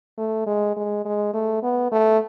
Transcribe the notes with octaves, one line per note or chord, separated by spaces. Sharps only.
A3
G#3
G#3
G#3
A3
B3
A3